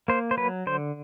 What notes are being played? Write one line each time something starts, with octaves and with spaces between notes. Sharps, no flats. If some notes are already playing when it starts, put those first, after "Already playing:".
A#3 C5
C5
F#3 B4
D3 C5